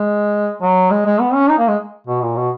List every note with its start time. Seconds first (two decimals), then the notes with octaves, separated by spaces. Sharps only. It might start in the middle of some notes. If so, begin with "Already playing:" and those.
Already playing: G#3
0.62 F#3
0.91 G#3
1.06 G#3
1.20 B3
1.34 C#4
1.50 D#4
1.58 A#3
1.68 G#3
2.07 B2
2.22 A#2
2.37 B2